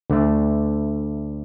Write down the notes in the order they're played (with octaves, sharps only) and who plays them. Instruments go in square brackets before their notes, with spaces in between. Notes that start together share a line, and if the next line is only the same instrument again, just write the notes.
[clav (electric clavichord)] D2 D3 A3